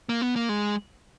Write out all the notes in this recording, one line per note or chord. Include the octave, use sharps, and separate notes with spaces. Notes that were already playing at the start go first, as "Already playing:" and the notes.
A#3
B3
A#3
G#3